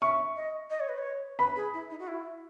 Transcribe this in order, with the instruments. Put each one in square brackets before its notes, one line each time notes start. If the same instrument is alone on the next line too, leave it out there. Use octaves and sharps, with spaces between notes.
[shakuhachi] E5 [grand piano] C#6
[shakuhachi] D#5
D#5
C#5
B4
C#5
[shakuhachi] B4 [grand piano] B5
[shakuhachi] G#4
E4
D#4
F#4
E4